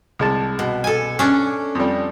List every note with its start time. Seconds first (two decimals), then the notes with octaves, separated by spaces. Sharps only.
0.19 C2 G#3 A5
0.59 B2
0.84 A4 G#5
1.19 C#4 D4
1.75 F2 G3